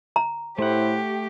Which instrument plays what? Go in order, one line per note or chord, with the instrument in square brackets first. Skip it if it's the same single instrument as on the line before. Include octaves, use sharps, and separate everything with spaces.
[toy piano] A#5
[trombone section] A2 E4 C5 [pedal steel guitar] A3 F#5 [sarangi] G4